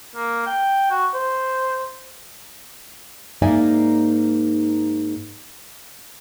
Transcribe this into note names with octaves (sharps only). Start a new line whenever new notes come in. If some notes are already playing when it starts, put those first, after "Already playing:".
A#3
G5
F#4
C5
G#2 A#3 D#4 D5 E5 G#5